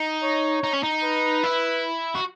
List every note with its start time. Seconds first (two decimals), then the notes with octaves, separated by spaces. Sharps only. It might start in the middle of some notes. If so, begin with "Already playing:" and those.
Already playing: D#4
0.23 C#5
0.63 D#4
0.73 C#4
0.83 D#4
1.03 B4
1.44 E4
2.15 F#4